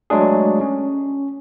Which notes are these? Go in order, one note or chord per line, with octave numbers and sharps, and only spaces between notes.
F#3 G#3 A3 D4 G#4
C#4